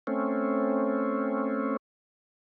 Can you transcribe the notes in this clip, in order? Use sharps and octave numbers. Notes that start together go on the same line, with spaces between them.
A3 C4 C#4